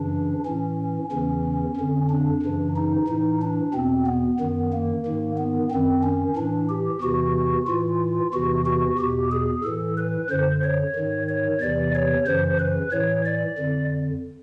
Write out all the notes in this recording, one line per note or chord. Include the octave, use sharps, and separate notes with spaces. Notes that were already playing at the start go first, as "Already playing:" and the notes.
Already playing: F#2 C#3 E3 D4
A2 E3 C#4
E2 C#3 E3 C#4
F2 D3
D4
F#2 C#3 E3
D#4
A2 E3 D#4
D4
E2 B2 C4
B3
F#2 D#3 B3
A#3
G#2 D#3
B3
F#2 D#3 C4
C#4
A2 E3 D4
G4
E2 C3 E3 F#4
A2 E3 F4
E2 C3 E3 F#4
F#4
E2 B2 G4
G#4
A2 E3 A4
B4
F#2 D3 C5
C#5
G#2 D#3
C#5
E2 C3 E3 D5
C#5
F#2 C#3 E3 C5
B4
A2 E3 C#5
D5
F2 D3